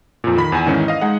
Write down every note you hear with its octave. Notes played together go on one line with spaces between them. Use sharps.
F2 A#2
D#3 B5 B6
E2 G#5
G#2 D#3 E3 C#4 D#4
D#5 F5
G#3 D#4 G#4 F#5